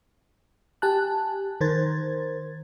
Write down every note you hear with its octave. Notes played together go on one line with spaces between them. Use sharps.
G4 G#5 A5 F#6
D#3 A#4 C5 G#6 A6